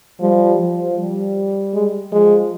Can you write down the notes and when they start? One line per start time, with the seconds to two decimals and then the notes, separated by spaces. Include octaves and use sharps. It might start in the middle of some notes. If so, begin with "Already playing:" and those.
0.21 F3 G3
0.59 F3
0.98 G3
1.74 G#3
2.12 F3 G#3